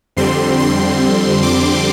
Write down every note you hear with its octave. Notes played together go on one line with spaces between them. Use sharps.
F2 D3 G3 C4 C6
C6
D6